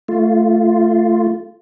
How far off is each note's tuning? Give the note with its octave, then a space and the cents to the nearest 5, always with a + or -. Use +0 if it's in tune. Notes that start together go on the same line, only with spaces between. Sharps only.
A3 +0 F4 -10